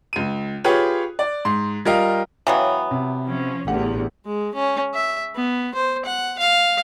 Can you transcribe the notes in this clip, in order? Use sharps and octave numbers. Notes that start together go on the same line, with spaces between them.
C#2 D#7
F4 G4 G#4 B4 C#5
D5
G#2 C6
G3 F4 A#4 D#5 F5
E3 F#3 B3 C#5 F5 G5
C3
F3 C#4
A1 E2 D3 G4 F#5
G#3
C#4
E5
B3
C5
F#5
F5